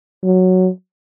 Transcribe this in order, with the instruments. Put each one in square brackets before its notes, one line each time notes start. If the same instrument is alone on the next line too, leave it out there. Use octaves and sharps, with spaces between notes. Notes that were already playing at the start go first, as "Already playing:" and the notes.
[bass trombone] F#3